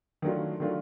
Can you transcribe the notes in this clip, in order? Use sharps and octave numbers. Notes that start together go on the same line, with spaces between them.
D#3 F#3 A3 D4 F4
D#3 F#3 A3 D4 F4